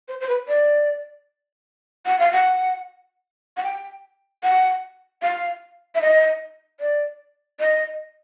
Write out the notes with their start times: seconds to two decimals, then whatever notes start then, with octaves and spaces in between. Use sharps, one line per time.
0.08 C5
0.21 C5
0.28 B4
0.48 D5
2.06 F#5
2.19 F5
2.32 F#5
3.57 F#5
3.64 G5
4.43 F#5
5.22 F5
5.95 E5
6.01 D#5
6.80 D5
7.60 D#5